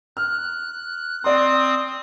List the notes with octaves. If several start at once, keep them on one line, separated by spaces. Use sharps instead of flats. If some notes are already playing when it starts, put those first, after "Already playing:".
F6 F#6
C4 D5 C6 D#6